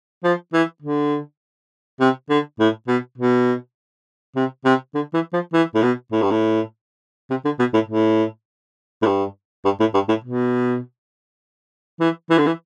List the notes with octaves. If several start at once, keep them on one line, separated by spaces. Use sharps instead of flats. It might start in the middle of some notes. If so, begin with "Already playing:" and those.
F3
E3
D3
C3
D3
A2
B2
B2
C3
C3
D3
E3
F3
E3
A2
B2
A2
G2
A2
C3
D3
B2
A2
A2
A2
G2
G2
A2
G2
A2
B2
E3
E3
D3
E3